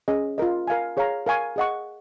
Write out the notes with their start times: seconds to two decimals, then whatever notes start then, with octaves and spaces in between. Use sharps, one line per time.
0.08 C#4 G#4 D#5
0.38 F4 A#4 D#5
0.67 A#4 F5 G#5
0.97 G#4 C#5 F5 A#5
1.26 A#4 F5 G#5 C#6
1.56 G#4 D#5 F#5 C#6